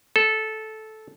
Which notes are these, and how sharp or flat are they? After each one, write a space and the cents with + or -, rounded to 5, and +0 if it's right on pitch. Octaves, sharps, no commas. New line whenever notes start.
A4 -10